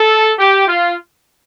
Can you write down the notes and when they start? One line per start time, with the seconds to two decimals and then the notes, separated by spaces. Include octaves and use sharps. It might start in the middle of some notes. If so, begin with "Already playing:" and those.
Already playing: A4
0.38 G4
0.67 F4